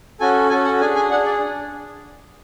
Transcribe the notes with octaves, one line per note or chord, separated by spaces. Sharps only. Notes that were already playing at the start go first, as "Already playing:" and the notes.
C#4 F#4 A4 G#5
C#4 F#4 A4 G#5
F#5
D4 G#4 G#5
G#5
D4 G#4 F#5
D5